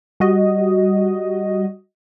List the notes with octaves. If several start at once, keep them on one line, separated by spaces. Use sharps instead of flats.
G3 F#4 D#5